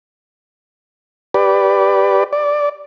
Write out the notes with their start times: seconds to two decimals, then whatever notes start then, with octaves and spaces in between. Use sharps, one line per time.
1.34 G4 B4 D5
2.33 D5